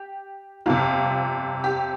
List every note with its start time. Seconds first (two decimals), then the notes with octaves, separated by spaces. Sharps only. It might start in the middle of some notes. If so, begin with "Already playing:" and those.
Already playing: G4
0.66 G1 F2 C3 F4
1.64 G4